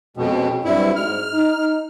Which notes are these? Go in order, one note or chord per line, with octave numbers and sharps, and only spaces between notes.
F2 B2 G#3 C#4 G5
G2 F#3 C4 E4 D5
G#2 F6
D#4